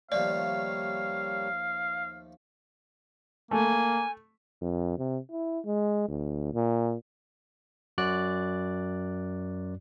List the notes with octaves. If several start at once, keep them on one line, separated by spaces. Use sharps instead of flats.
D#2 F3 G3 A3 A#3 C#5 D5 F5
A3 A#3 G#5
F2
C3
E4
G#3
D2
A#2
F#2 F#4 D5 F#6